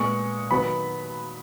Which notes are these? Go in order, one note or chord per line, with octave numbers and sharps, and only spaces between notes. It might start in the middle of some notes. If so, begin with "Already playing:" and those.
Already playing: A#2 G#3 B3 C#6
D#3 F#3 B3 B5